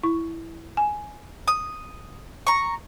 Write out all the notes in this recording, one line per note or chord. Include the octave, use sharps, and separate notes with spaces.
E4 C#6
G#5
D#6
A#5 C#6